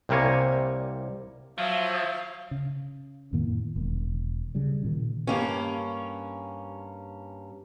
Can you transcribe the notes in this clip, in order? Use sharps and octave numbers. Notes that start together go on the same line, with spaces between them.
C2 C3 G3 A#3 C#5 G#5
F3 F#3 E5 F5
C#3
F2 A2 D#3 A#3
E1 D#3
C#3 G3
A#2 D#3
G2 A#3 C#4